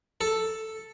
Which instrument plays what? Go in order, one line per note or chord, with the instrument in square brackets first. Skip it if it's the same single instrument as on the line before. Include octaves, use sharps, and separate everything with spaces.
[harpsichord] A4